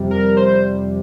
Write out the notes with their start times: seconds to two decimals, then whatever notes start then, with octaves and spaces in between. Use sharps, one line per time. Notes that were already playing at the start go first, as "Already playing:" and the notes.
Already playing: F2 C3 G3
0.11 A#4
0.37 C5